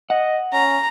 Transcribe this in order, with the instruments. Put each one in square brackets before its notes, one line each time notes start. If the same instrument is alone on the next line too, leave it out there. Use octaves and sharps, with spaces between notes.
[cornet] D#5 [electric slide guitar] F#5
[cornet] C#4 [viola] A#5